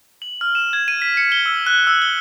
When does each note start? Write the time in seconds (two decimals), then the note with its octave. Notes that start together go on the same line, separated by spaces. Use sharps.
0.22 F#7
0.41 F6
0.55 E7
0.73 G#6
0.88 D#7
1.02 B6
1.17 C#7
1.32 G7
1.46 E6
1.66 F#6
1.87 E6
2.02 G7